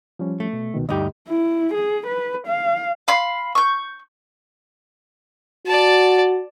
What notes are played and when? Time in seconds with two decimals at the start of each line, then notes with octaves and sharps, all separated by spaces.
0.19 F3 G3 C#4
0.40 A3
0.53 B2
0.74 C2 B2 D#3
0.89 D2 G2 D#4 G4 D#5
1.29 E4
1.74 G#4
2.07 B4
2.47 F5
3.08 F5 B5 C6
3.55 C#6 G6
5.67 F#4 D5 A5